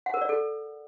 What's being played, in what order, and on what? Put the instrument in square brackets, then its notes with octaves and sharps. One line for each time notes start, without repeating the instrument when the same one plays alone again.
[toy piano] F#5
A#4
D5
A4